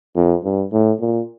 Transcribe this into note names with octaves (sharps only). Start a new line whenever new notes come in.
F2
G2
A2
A#2